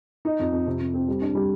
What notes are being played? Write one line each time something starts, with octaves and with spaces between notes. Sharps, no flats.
D#4
F2
F2
C3
C3
C4
G3
D4
G3